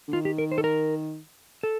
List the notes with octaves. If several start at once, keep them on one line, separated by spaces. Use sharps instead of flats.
D3
D#3 F4
G4
A#4
C5
A4
A#4
A4